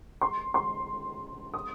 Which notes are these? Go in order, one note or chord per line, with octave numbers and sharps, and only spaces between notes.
C6
C6
D#6